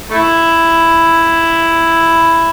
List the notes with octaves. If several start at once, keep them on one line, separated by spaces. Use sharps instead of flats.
A3 E4